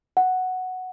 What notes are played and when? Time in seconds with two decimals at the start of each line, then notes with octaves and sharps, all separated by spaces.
0.17 F#5